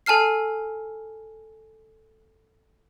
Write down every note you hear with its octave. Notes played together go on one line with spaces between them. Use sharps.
A4 G#5 A5 F6 C7